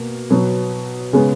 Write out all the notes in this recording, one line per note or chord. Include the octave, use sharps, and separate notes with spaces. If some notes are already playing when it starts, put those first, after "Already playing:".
Already playing: B2 A#3
B2 F#3 B3
C#3 G#3 B3